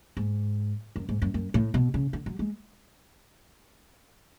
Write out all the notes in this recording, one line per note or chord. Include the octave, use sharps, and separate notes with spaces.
G#2
F#2
G#2
F#2
F#2
A2
B2
C#3
D3
F#3
G#3